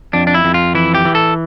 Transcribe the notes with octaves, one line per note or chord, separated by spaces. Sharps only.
F2 D4
D4
E4
F2
F4
E3 E4
G4
E3
A4